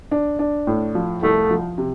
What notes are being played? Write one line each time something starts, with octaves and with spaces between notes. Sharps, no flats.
D4
D4
A2
F3
C2 A3
F3
C3